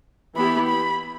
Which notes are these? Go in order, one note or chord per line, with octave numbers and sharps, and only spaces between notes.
E3 B3 E4 G4 B5
B5